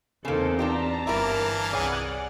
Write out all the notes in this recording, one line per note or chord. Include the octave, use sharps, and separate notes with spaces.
E2 C#3 A#3 C4 D#4 A4 C5
D4 F4 G4 A5 A#5
G1 E3 E4 A#4 F5 D6
C2 G#4 C#5 D5 F#5 G#5